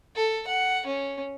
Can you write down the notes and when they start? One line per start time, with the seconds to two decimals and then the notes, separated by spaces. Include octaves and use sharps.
0.16 A4
0.47 F#5
0.86 C#4